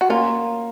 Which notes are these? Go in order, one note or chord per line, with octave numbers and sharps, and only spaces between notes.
F#4
A#3 C#4 F4